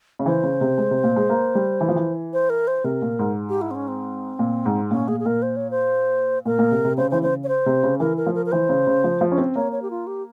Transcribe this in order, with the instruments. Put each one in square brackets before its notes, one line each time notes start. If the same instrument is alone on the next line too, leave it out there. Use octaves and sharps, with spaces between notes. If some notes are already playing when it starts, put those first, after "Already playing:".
[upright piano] C#3
[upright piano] E3 [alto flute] C5
[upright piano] C#3
C3
G#3
C3
A#2
G#3
A#3
G3
E3
F3
E3
[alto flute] C5
A#4
C5
[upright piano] C3 [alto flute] A#4
[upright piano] A#2
G#2
[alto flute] G4
E4
C4
C#4
C4
[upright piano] A#2
G#2
[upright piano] A#2 [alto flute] C#4
[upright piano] A#2 [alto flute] G#4
[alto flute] G#4
[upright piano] A#2 [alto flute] A#4
[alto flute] C5
C#5
C5
[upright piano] A#2 [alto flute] A#4
[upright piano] A#2
C3
C3
[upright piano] C#3 [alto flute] C5
[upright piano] E3 [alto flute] C5
[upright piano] C#3 [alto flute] C5
[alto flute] C#5
C5
[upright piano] C3
C#3
[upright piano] E3 [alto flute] A#4
[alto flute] A#4
[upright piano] F3
[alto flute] A#4
A#4
[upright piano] E3 [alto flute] C5
[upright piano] C#3
C#3
F3
F3
C#4
C4
[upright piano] A#3 [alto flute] C#5
[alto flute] C#5
G4
F4
G4